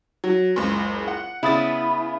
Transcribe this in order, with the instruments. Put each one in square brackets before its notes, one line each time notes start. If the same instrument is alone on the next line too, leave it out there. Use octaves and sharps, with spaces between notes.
[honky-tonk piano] F#3
F#1 C#2
F#5
[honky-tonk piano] C#3 D#6 A6 [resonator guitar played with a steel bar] B3 E4